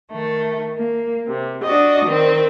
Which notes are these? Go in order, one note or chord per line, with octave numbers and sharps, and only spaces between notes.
D#3 A3
A#3
C3
D4 F#4 D5 D#5
D#3 C4